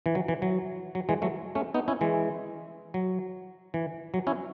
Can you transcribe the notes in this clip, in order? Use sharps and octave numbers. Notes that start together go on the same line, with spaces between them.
E3
F#3
E3
F#3
F#3
E3 G#3
F#3 A3
A3 C#4
B3 D#4
C#4 E4
E3 G#3
F#3
E3
F#3
C#4 E4